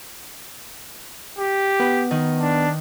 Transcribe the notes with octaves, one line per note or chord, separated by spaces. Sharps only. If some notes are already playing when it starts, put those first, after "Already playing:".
G4
B3 B4
D#3
D4